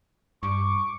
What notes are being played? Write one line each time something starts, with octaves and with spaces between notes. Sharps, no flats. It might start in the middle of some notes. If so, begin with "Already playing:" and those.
G2 C#6 D6